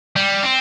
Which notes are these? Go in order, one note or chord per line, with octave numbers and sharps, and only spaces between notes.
G3
C4